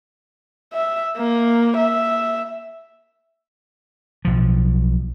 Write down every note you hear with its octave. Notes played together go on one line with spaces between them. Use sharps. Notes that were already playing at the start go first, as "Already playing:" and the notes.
E5
A#3
E5
B1 F3